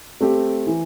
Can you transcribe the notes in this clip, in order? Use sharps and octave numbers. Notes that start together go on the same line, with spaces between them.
A3 C4 G4
E3